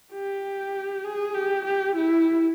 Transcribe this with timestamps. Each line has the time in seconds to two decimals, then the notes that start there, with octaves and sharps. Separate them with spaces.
0.13 G4
1.04 G#4
1.34 G4
1.65 G4
1.95 E4